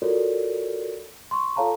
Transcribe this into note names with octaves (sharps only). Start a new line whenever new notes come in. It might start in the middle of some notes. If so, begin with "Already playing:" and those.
F4 F#4 A4 A#4 C#5 D5
C6 C#6
F4 A4 C#5 F5 A5 A#5